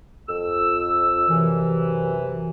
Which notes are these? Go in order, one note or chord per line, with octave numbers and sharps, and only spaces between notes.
F2 E6
F#2 C3 E3